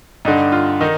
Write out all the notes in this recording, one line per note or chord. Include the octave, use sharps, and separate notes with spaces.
G2 D3 D#4
F4
D#3 D#4